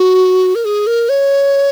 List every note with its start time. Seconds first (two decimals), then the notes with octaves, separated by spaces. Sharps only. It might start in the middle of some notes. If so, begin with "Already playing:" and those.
Already playing: F#4
0.55 A#4
0.65 G#4
0.87 A#4
1.09 C#5